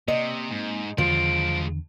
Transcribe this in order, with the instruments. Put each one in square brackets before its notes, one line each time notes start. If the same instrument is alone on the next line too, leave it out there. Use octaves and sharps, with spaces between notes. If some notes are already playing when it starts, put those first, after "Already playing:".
[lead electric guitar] C3 [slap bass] A#3 C4 [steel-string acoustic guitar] D#5
[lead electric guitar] G#2
[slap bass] E2 D3 D#3 [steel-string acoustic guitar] F3 [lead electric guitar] G#3 F4 [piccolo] D7